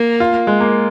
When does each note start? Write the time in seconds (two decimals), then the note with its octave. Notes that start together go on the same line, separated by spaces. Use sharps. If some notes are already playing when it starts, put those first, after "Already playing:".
Already playing: A#3
0.20 F4
0.47 G#3
0.61 A#3